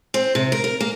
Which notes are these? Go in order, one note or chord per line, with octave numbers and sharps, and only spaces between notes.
C4
C3
A#4
A#4
A#3